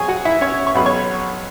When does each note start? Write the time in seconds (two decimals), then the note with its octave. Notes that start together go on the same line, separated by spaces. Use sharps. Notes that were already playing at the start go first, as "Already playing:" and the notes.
Already playing: B2 F#3 G#4 C#5 G#5 C#6
0.08 F#4 F#5
0.25 E4 E5
0.41 C#4 C#5
0.67 C#6
0.75 B1 B2 F#3 B5
0.86 C#5 C#6